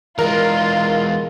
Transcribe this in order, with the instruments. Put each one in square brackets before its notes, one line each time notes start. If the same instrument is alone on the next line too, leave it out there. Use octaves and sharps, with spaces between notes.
[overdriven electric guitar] E3 G#3 [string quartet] F4 [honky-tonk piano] A#4